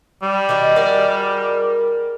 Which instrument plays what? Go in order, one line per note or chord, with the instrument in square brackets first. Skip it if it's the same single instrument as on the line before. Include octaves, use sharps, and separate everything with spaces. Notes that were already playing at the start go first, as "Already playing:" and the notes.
[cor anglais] G3
[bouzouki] D#3 F3 F#4
[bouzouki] F#4 G#4 D5 [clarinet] A#4